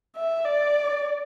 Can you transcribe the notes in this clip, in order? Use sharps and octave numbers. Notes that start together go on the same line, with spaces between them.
E5
D5